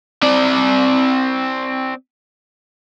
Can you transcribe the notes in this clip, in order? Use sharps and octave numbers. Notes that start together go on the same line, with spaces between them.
C4 D5